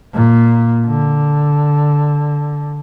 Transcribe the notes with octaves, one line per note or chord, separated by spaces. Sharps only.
A#2
D3